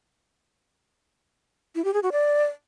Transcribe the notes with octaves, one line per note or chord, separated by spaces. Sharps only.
E4
G4
G#4
F#4
D5